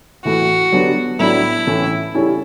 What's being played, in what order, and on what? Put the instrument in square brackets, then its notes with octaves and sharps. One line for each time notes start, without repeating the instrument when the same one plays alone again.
[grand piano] A2 E3 A3 [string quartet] F#4
[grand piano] D3 F#3 B3 D4 G4
[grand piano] A2 F#3 B3 D4 A4 [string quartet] E4
[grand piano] A2 E3 A3 C#4
C#3 G3 C#4 E4 A4